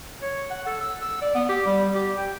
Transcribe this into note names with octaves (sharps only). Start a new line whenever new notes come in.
C#5
F#5
A4
E6
E6
D5
B3
G4
G3
G4
G5